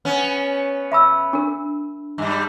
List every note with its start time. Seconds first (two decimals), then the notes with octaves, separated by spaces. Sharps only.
0.05 B3 C#4
0.92 E5 B5 E6
1.33 D4 A#4
2.18 G2 G3